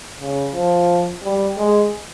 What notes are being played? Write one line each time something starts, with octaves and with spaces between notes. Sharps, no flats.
C#3
F3
G3
G#3